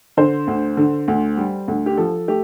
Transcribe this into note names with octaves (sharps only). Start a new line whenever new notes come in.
D3 C5
D2
D3
D2
G3
D2
G4
F3 A4
A3 G4